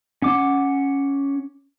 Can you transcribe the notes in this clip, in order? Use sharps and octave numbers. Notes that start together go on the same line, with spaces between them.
C#4 F#5 D6